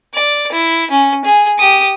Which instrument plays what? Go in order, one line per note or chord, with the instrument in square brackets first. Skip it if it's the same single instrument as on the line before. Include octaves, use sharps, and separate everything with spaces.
[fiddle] D5
E4
C#4
G#4
G4 D#6